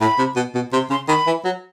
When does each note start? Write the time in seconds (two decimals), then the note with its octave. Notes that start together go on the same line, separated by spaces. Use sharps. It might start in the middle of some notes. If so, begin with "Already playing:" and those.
0.01 A2 B5
0.19 C3
0.36 B2
0.55 B2
0.73 C3 C6
0.90 C#3 C6
1.08 D#3 B5
1.27 E3
1.45 F#3